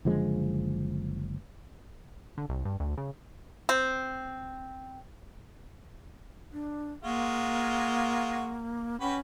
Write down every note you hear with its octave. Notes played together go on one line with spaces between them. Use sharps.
F#1 D3 F3 G#3
D3
C2
G2
D2
C#3
C4
D4
G#3 A#3 F4 F#4
C#4 F#4 G4 B4